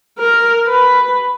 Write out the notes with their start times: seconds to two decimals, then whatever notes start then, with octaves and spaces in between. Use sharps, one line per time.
0.19 A#4
0.67 B4